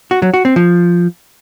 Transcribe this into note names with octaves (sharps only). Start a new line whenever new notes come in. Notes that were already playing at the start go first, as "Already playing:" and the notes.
F#4
F#3
F#4
C4
F3